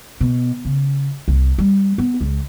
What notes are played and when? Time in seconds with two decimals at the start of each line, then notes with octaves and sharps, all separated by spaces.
0.21 B2
0.65 C#3
1.28 C2
1.58 G3
1.98 B3
2.21 C#2